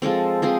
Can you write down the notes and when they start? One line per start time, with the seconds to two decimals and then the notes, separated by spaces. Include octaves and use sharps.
0.02 F3 G#3 C4 A4
0.42 F3 G#3 C4 G#4